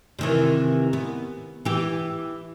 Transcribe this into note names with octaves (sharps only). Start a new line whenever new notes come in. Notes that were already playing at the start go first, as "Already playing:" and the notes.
C3 D#3 E3
B3
E3 G4